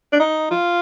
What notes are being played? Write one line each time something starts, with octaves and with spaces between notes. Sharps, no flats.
D4
D#4
F4